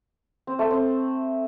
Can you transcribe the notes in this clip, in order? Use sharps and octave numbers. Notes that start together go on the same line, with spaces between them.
C4
A3
C4